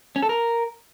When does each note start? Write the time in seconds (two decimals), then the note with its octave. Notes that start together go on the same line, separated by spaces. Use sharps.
0.16 C#4
0.23 A4
0.29 A#4